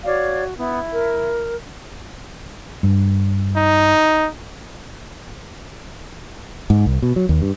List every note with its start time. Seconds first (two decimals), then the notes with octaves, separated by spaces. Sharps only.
0.04 F#4 C#5 D5 F5
0.57 B3 E4
0.93 A#4
2.83 G2
3.56 D#4
6.70 G#2
6.86 C2
7.02 B2
7.16 F#3
7.29 D#2
7.42 G2